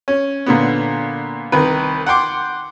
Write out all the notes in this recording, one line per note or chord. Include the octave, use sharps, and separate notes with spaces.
C#4
A#2 D3 B3
C2 D#3 B4
F#5 G5 C6 D6